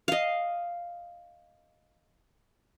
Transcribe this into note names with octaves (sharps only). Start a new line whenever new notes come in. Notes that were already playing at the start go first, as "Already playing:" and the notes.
D#5 F5